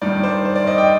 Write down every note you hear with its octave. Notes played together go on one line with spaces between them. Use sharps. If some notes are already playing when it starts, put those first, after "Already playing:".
G2 D#3 D5
C5
C5
D5
D#5
G5